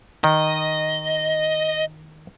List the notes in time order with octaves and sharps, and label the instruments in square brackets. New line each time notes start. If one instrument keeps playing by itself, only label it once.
[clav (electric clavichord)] D#3 [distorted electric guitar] D#5